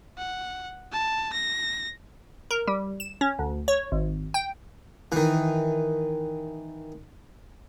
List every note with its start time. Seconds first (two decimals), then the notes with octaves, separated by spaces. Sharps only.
0.17 F#5
0.92 A5
1.32 A#6
2.51 A#4
2.68 G3
3.00 E7
3.21 C#4
3.39 D2
3.68 C#5
3.92 G#1
4.34 G5
5.12 D#3 E3